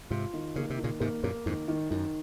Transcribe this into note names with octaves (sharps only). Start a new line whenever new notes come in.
G#2 C3 F4
D#3
C#3 A#3
C3
D#3
A#2 C#3
G#2 C3 A#3
F#2 A#2 A#3
F2 G#2 D#3
D#3
F#2 D#3